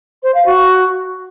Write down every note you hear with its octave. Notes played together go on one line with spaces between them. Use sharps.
C5
F5
F#4